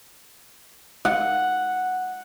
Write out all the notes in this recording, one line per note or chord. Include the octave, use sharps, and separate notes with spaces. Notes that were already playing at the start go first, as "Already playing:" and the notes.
F#5